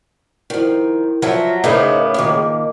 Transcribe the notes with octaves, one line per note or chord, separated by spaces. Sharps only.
D#3 F3 E4 A#4
F3 F#3 F4 E5
A2 C#3 B3 D#4 A#4 C5 D6
D#3 F3 A#3